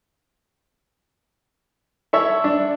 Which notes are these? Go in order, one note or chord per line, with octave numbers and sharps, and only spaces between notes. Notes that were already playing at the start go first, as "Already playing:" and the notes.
E4 A4 C#5 E5
D4